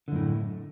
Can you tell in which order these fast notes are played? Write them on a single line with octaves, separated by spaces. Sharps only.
D3 F#2 A2